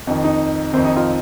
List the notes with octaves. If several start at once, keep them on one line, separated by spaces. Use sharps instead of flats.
F2 D#3
D#4
F2 D#3 C4
D#4
F4